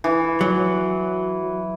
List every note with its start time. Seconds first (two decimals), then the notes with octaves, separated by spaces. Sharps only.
0.04 E3
0.41 F#3